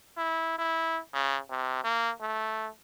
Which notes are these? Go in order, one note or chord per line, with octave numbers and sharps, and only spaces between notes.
E4
E4
C#3
C3
A#3
A3